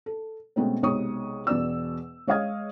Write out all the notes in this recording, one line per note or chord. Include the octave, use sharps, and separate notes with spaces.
A4
B2 G#3 A3 C4 C#4
B1 C3 G#3 C#5 C#6 D#6
E1 B2 B3 D5 E6
G#3 C#5 D#5 F5 D#6 G#6